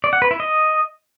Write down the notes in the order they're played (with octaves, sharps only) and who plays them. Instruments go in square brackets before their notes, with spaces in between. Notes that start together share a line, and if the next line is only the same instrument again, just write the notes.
[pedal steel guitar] D5
F#5
B4
E4
D#5